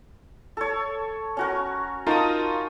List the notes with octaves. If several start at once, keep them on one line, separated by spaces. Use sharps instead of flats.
A4 C#5
C#4 F#4 A#4
D#4 F4 A#4 A5 D#6